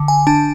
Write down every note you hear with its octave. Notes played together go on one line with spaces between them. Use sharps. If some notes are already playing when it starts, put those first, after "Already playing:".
Already playing: D3
G#5
D4 A5